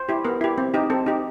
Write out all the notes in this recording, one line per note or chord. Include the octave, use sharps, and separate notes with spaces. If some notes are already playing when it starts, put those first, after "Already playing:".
Already playing: C5
E4 G4
B3 A#4
E4 G4
C4
D#4 G4
C4 A4
D#4 G4